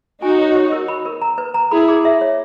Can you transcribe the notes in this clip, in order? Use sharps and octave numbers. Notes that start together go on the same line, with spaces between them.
D#4 F#4 G#5
C#5
C#5
A#4
B5
A#4
A#5
B4
A#5
E4 G#4 B5
G#4
E5
C#5